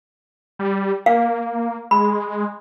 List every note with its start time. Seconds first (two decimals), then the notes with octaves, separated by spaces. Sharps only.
0.59 G3
1.06 A#3 F5
1.91 G#3 B5